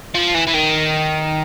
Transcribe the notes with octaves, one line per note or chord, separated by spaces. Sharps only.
F3
E3
E3
D#3